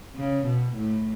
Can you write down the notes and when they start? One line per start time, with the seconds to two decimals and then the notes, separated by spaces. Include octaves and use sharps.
0.16 C#3
0.46 B2
0.76 A2